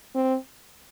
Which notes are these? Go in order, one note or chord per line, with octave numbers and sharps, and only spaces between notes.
C4